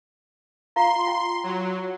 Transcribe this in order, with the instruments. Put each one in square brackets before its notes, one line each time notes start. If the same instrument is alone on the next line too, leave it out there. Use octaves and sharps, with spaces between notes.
[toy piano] F4 F5 A#5 [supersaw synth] C6
[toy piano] F4 G5
[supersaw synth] F#3